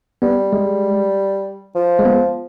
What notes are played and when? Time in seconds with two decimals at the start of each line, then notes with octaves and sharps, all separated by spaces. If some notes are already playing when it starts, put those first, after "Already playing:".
0.22 G3 B3
0.53 G#3
1.75 F3
1.99 G#3
2.05 B3